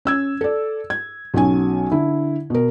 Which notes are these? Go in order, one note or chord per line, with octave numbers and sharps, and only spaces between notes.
C#4 E6 G#6
A4 D5
G#6
B1 F#3 C#4 G#5
D3 E4
B2 A#4